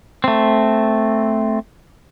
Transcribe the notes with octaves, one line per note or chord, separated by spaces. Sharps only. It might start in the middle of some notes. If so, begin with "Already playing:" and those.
A3 C4